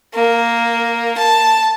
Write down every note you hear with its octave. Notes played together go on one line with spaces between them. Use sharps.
A#3
A5